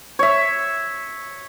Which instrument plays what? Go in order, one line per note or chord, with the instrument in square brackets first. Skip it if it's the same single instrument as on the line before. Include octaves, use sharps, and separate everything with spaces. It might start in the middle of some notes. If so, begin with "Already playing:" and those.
[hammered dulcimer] C#5 E5